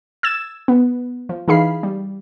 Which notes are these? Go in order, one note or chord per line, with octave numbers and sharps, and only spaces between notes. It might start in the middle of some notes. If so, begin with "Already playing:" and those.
E6 G#6 A6 E7
B3
F3
E3 D#4 G#4 F5 B5 C7
G3